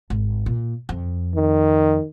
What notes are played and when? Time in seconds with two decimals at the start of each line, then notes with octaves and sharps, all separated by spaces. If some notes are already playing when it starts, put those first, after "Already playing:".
0.10 G#1
0.46 A#2
0.89 F2
1.35 D#3